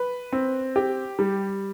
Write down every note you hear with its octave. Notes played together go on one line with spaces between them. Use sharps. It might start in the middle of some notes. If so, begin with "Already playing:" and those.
Already playing: B4
C4
G4
G3